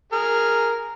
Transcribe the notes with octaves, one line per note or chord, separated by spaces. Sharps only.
G#4 A#4